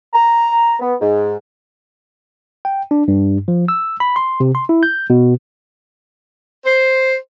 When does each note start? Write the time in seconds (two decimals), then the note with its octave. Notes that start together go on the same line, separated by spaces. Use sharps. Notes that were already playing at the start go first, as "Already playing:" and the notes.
0.14 A#5
0.80 B3
1.01 G#2
2.65 G5
2.91 D4
3.08 G2
3.48 F3
3.68 E6
4.00 B5
4.16 C6
4.40 C3
4.55 C6
4.69 E4
4.83 G6
5.10 B2
6.65 C5